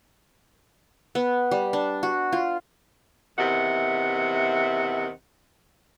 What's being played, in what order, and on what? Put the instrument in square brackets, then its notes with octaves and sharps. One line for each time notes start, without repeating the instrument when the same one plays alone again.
[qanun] B3
G3
D4
F#4
F4
[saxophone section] E2 C3 D#3 E5 F#5